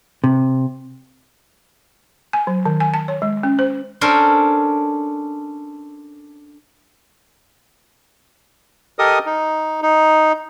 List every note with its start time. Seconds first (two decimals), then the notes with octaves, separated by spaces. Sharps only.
0.24 C3
2.33 G#5
2.47 F#3
2.66 D#3
2.80 G#5
2.94 A5
3.08 C#5
3.22 G#3
3.43 C#4
3.59 C5
4.01 C#4 D4 A4 A#4 C5
8.99 G4 A4 A#4 D#5 D#6
9.26 D#4
9.82 D#4